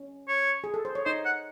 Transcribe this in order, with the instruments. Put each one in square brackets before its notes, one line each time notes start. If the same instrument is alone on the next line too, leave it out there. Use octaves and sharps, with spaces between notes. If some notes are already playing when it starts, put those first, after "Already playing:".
Already playing: [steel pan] C#4
[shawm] C#5
[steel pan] G#4
A4
C5
C#5
[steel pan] D#4 D#5 [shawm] C5
[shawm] F#5